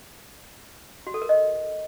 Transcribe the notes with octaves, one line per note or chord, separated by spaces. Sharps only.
F#4
A4
A#4
D#5